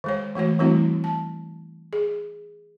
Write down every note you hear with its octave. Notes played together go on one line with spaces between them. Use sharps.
D#3 G#3 C#5
E3 A3 F#4 C#5
E3 G3 A3 C4 E4 F#4
A5
G#4